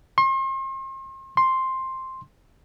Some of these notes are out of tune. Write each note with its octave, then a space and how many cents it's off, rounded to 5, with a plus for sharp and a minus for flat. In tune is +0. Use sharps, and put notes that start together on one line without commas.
C6 +40
C6 +5